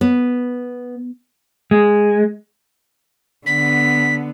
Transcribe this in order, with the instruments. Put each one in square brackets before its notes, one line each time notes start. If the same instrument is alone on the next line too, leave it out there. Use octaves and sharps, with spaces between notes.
[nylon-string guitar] B3
[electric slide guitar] G#3
[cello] D3 B3 [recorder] B6